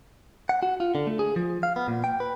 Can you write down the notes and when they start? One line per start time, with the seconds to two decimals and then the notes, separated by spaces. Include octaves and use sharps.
0.49 F#5
0.63 F#4
0.80 F4
0.95 D3
1.07 A3
1.19 G#4
1.36 F3
1.63 F5
1.76 B3
1.88 A#2
2.04 G5
2.20 B4